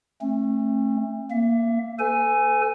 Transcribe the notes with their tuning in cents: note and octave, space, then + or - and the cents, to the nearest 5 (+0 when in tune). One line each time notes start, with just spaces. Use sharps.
A3 +0 C4 +45
A#3 +0 E5 +30
A4 +0 C5 -45 G#5 +0